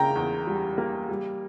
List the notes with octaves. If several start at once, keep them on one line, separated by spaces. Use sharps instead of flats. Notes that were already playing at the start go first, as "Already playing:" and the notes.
Already playing: C#3 A#3 G5 A#5
E2
G3
A#3
G3